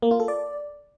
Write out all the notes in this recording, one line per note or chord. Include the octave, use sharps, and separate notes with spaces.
A#3
F4
A4
D5